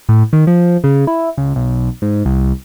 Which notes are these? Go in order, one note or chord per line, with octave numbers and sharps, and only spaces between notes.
A2
D#3
F3
C#3
E4
C#2
B1
G#2
C2